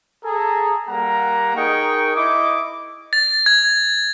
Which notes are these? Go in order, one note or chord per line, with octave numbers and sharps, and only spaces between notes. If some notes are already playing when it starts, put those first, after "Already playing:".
G#4 A4 A#5
G3 A#3 F#5 A#5
D#4 G#4 A#4 D#5 G5 C#6
E4 D#5 D6
A6
G#6